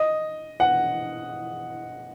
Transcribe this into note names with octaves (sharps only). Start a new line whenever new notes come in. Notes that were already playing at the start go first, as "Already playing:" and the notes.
Already playing: D#5
F#5